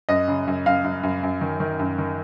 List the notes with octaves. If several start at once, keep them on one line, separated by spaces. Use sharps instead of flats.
F#2 D#5
C#3
F#2
F#2 F5
F#2
F#2
F#2
D#3
D#3
F#2
D#3